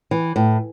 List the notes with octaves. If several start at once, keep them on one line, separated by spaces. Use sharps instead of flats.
E3
A2